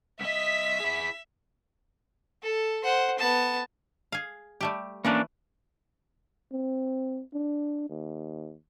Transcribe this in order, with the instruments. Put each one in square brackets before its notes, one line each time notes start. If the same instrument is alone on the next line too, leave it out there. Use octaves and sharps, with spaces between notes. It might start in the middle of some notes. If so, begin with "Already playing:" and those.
[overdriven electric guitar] C2 D#5 [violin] E5 [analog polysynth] B6
[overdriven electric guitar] E4 G#4
[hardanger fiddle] A4
C5 F#5
B3 A5
[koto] G#4 F5
G3 A3 G4
[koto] E3 A3 B4 [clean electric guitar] A#3 C#4 D4
[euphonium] C4
D4
D#2